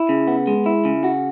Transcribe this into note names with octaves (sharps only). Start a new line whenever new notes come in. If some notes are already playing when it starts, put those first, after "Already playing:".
Already playing: E4
C#3
B3
G#3
E4
C#3
F#4